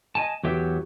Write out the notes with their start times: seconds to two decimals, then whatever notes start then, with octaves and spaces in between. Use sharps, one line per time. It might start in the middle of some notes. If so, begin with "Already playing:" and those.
0.15 D#5 G#5 A5
0.43 E2 F#3 G4 E5